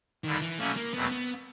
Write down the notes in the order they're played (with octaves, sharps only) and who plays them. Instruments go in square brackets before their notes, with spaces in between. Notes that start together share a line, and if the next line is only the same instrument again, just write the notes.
[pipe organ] F2 D3 G3 [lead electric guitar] D#3
[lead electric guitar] E3
[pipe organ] B2 F#3 A#3 C#4 [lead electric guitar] A3
[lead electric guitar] A#3
[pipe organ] E2 B2 F#3 A3 C4 [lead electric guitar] B3
[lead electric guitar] B3